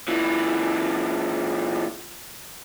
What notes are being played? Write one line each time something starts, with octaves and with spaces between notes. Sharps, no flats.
A#2 E3